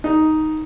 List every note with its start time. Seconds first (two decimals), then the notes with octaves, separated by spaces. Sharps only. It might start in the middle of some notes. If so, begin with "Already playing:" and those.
0.04 D#4